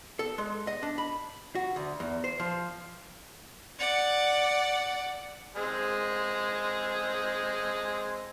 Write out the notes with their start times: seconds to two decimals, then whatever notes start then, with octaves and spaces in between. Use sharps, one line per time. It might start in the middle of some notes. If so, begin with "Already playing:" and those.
0.19 A4
0.38 G#3
0.67 D#5
0.83 D4
0.98 B5
1.55 F#4
1.76 D2
2.00 E2
2.24 C5
2.40 F3
3.79 D5 F#5
5.57 G#3 C4 G#4